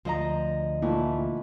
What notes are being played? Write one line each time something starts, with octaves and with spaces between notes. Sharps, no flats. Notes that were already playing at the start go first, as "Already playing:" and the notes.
D2 F3 D#5 A#5
A#2 E3 A3